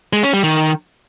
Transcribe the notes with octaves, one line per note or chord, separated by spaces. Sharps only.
G#3
C#4
G3
D#3